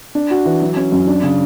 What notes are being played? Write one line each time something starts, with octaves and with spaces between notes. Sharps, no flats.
D4
F#4
E3
F#3
C#4
F#2
D4
C#3